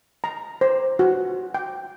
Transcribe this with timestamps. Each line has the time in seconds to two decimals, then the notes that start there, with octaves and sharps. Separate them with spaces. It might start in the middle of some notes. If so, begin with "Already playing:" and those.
0.24 A#5
0.61 C5
0.99 F#4
1.55 G5